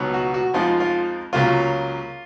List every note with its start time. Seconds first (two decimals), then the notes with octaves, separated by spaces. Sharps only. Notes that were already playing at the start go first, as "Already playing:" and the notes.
Already playing: C#2 B2 F#3 B3 D#4
0.14 F#4
0.34 F#4
0.54 F2 F3 G#3 D#4 F4
0.80 F4
1.33 C#2 C#3 F#3 A#3 F4